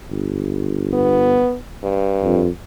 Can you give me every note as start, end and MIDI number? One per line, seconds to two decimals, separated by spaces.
0.11 1.45 31
0.94 1.56 59
1.83 2.44 43
2.23 2.49 41